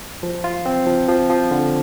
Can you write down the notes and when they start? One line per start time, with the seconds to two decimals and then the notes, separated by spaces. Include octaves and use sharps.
0.23 F3
0.44 F4
0.66 C4
0.87 F3
1.08 F3
1.30 F3
1.51 D3